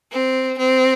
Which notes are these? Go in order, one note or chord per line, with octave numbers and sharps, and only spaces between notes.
C4
C4